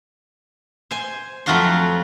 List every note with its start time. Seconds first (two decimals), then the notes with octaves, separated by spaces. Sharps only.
0.91 C5 G#5
1.46 F2 F#3 A3 F4 F#4 C6